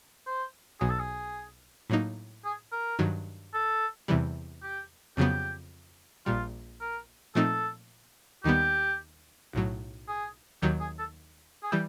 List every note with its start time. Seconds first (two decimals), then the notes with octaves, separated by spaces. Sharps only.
0.27 C5
0.80 B1 B2 F#3 G#4
0.89 A4
0.99 G#4
1.90 A2 F#3 A#3 D#4
2.44 G#4
2.72 A#4
2.99 G2 D#3 F#3
3.54 A4
4.08 E2 C3 E3 G3
4.62 G4
5.17 F2 C#3 F#3 B3 G4
6.26 A#1 A#2 G3 F4
6.81 A#4
7.35 A#2 F3 A3 C4 D#4 A4
8.44 D#2 D#3 G3 B3 G4
9.53 B1 A2 F#3
10.08 G#4
10.62 D#2 D#3 F#3 G4
10.81 G#4
10.99 A4
11.63 G#4
11.71 E3 G3 G4